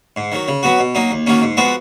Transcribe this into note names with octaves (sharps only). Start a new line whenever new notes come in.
G#2
D#3 F#3
C#3
F#3 B3 F#4
B2
F#3 A#3 D#4
D#2
D#3 F#3 A#3 C#4
G#2
F3 G#3 B3 F#4